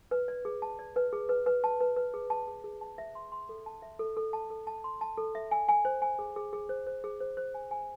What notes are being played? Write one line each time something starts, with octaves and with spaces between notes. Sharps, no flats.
B4
D5
G#4
A5
D5
B4
G#4
B4
B4
A5
B4
B4
G#4
A5
G#4
G#4
A5
E5
C6
C6
A4
A5
E5
A4
A4
A5
A4
A5
C6
A5
A4
E5
G#5
G#5
C5
G#5
G#4
G#4
G#4
C5
C5
G#4
C5
C5
G#5
G#5